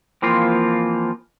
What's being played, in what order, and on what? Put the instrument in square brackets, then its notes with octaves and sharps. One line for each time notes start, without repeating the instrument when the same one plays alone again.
[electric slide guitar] E3 F3 A#3 C4 F4